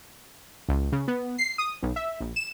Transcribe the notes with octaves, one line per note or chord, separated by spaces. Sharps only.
C#2
C#3
B3
C7
D#6
B1
E5
A#1
E7